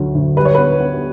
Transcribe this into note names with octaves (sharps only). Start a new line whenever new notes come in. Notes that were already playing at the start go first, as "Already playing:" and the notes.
Already playing: D2 D3 F#3
D2
G3 B4
C#5
B3 B4
B3